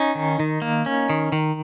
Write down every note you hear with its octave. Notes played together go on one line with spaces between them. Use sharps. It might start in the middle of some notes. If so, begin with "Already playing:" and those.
Already playing: C#4 D#4
D#3
D#3
A#3
C#4
D#3
D#3